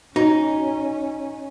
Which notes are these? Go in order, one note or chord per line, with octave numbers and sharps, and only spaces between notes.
C#4 D#4 F#4